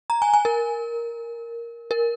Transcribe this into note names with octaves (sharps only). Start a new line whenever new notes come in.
A#5
G#5
G#5
A#4
A#4